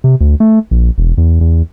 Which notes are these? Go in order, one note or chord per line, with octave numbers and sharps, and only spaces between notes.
C3
D2
A3
A#1
E1
E2
E2